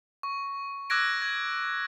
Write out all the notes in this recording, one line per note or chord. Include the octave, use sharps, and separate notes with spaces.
C#6
D6 E6 F#6 G#6 A#6 D7
G#6